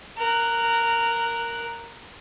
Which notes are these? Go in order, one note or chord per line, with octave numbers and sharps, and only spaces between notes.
A#4 F#6